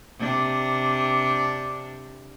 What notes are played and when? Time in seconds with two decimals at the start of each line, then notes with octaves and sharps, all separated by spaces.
0.19 C3 D4